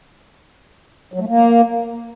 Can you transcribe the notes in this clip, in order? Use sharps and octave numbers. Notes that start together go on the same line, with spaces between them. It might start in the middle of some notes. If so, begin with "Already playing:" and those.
F#3
A3
A#3